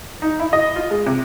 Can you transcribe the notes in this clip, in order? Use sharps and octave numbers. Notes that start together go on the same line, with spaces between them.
D#4
E4
D#5
F4
G#3
C3